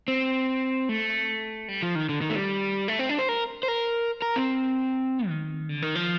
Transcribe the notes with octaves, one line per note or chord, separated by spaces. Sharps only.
C4
A3
G3
F3
D#3
D3
D#3
A3
G3
A3
C4
D4
C5
A#4
C5
A#4
A#4
C4
D#3
D3
D#3
F3